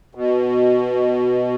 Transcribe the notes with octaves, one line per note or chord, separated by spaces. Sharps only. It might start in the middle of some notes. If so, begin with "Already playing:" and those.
B2